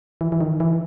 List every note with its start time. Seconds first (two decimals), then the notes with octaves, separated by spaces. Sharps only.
0.21 E3
0.32 E3
0.41 D#3
0.60 E3